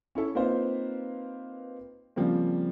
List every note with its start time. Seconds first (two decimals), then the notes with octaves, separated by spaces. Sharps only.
0.15 C#4 E4 A4
0.35 A#3 C4 D#4 F4 B4 C5
2.16 C#3 F3 G3 A#3 C4